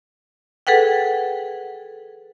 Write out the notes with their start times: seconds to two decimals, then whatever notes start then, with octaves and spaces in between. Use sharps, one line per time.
0.67 G#4 A4 B4 F#5 G5